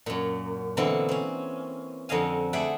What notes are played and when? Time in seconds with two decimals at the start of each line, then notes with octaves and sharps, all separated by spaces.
0.06 F#2 A#2
0.77 B2 D3 E3 A#3 C4 E4
1.09 C4 C#4
2.09 F2 D3 C4 D#5 F5 G#5
2.53 A3 G#4 D5 E5 F#5 G5